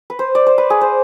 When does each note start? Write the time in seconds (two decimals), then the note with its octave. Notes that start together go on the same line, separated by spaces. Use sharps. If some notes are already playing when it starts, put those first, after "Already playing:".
0.10 B4
0.19 C5
0.35 D5
0.47 C5
0.58 B4
0.70 G#4
0.81 C5